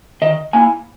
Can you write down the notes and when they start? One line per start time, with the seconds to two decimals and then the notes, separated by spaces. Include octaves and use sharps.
0.22 D#3 D#5
0.53 A#3 E4 G#5